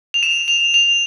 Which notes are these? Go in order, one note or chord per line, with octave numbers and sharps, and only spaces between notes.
F7
E7
F7
F7